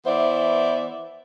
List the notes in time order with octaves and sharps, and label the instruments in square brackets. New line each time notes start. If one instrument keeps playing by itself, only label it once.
[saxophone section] E3 B3 C5 D5 E5